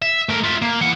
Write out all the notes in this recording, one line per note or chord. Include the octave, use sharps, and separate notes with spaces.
E5
A3 A#4
F4 E5
A#3
E3 F#5